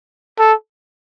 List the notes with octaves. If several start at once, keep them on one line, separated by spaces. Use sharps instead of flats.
A4